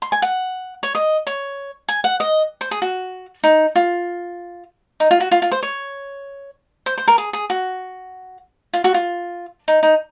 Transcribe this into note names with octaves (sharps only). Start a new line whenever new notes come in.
C6
G#5
F#5
C#5
D#5
C#5
G#5
F#5
D#5
C5
G#4
F#4
D#4
F4
D#4
F4
F#4
F4
F4
C5
C#5
C5
C5
A#4
G#4
G#4
F#4
F4
F#4
F4
D#4
D#4